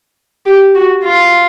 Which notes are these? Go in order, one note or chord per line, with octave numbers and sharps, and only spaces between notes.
G4
F#4
F4